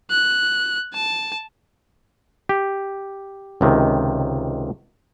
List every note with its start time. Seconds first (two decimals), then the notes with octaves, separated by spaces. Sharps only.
0.10 F#6
0.94 A5
2.49 G4
3.61 C#2 C3 D#3